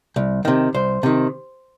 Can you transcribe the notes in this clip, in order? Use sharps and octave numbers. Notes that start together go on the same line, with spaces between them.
C2
C3 D#3
C2 C5
C3 D#3